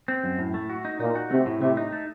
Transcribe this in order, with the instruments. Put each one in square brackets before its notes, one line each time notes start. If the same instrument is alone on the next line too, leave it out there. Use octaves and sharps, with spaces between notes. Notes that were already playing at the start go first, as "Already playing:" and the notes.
[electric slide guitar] C4
F#2
A2
A3
F#4
D#4
[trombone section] A#2 [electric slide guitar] D#4
[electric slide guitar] F#4
[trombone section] C3 [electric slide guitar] A3
[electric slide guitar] A2
[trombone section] C3 [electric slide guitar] A3
[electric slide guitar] D#4
A3